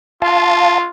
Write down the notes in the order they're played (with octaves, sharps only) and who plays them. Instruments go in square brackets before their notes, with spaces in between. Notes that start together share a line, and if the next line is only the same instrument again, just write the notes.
[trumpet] F4 [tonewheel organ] F5 A5